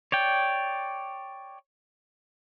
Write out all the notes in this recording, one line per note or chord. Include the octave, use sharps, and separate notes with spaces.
C#5 D5 G5